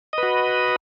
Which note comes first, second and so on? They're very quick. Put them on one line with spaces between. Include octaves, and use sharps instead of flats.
D#5 B4 F#4